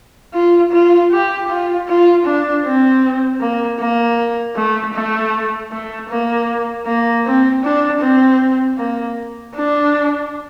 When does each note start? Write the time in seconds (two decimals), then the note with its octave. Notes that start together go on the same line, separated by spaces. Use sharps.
0.34 F4
0.72 F4
1.12 G4
1.49 F4
1.88 F4
2.26 D4
2.65 C4
3.41 A#3
3.80 A#3
4.56 A3
4.94 A3
5.72 A3
6.10 A#3
6.86 A#3
7.25 C4
7.64 D4
8.01 C4
8.78 A#3
9.56 D4